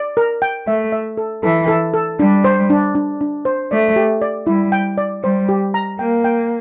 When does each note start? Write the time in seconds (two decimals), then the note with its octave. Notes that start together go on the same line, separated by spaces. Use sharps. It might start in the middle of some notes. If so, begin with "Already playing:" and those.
Already playing: D5
0.17 A#4
0.42 G5
0.67 A3 E5
0.92 E5
1.17 A4
1.43 E3 A4
1.68 A4
1.94 A4
2.19 G3 D4
2.44 C5
2.70 D4
2.95 D4
3.21 D4
3.45 C5
3.71 A3 D5
3.96 G4
4.22 D5
4.47 G3 E4
4.72 G5
4.98 D5
5.23 G3 C5
5.49 G4
5.74 A#5
5.99 A#3 G5
6.24 G5